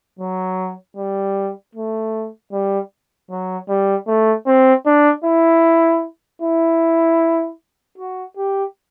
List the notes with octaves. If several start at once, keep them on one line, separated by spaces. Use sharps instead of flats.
F#3
G3
A3
G3
F#3
G3
A3
C4
D4
E4
E4
F#4
G4